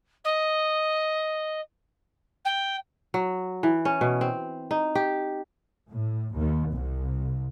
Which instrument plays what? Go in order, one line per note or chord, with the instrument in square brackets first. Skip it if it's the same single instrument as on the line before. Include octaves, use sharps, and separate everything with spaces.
[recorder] D#5
G5
[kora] F#3
E3
C#4
B2
C4
D#4
G4
[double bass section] A2
D#2
C2